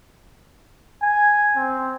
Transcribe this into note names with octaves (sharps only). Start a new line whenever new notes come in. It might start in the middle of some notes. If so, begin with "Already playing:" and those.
G#5
C4